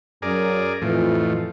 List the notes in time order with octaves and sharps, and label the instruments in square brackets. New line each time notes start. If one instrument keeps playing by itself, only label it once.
[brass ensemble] F#2 [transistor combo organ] G#4 A#4 D5
[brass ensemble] F2 E3 [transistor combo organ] A2 F3